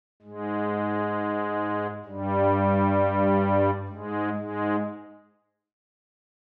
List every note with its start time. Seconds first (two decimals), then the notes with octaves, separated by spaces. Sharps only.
0.22 G#2 G#3
2.05 G2 G3
3.88 G#2 G#3
4.35 G#2 G#3